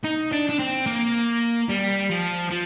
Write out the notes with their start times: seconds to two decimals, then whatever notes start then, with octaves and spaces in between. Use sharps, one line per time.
0.04 D#4
0.32 D4
0.49 D4
0.59 C4
0.86 A#3
1.69 G3
2.10 F3
2.50 F3